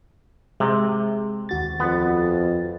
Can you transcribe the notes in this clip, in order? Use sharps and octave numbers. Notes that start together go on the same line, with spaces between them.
C3 G#3
D#2 F#4 A6
F2 B3